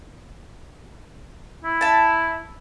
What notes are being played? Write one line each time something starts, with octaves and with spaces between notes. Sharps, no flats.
E4
E5 A5